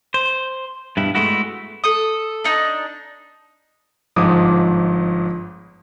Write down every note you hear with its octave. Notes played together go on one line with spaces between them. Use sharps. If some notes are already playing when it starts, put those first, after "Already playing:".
C5
G2 B2 E4
G#3 A3 B3 E4 F#4
A4 D#6
D4 D#4 A5
G1 G#2 F3 D6 D#6